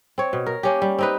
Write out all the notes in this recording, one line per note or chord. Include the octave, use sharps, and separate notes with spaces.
C4 C#5
B2
A#4
A#3 C#4 G4
G3
C4 D#4 B4